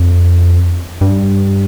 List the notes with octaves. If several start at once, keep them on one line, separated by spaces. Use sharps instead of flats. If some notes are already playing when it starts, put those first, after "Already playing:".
Already playing: F2
G2